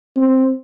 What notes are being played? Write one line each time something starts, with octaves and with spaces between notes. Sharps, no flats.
C4